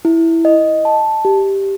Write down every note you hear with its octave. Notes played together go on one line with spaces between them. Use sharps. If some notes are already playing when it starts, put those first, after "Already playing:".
E4
D#5
A5
G4